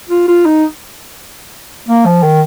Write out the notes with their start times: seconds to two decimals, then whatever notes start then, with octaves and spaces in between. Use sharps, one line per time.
0.09 F4
0.28 F4
0.46 D#4
1.89 A#3
2.06 F3
2.23 D#3